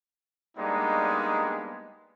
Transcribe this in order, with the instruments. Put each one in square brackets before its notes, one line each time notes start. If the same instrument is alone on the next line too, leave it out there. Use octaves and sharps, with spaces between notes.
[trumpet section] G3 G#3 A#3 B3 D4 D#4